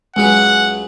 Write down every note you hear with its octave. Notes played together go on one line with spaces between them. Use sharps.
C#2 F#3 G#3 B4 F#5